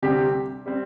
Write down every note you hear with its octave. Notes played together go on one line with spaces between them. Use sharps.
D2 C3 G3 C4 G4
G3 C4